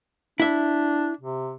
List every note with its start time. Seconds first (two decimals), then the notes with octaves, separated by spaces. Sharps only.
0.40 D4 E4 E5
1.21 C3